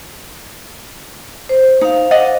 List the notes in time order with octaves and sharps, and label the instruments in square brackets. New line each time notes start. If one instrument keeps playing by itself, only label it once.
[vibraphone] C5
[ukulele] D#4 [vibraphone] C5 F5
[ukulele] D5 D#5 F#5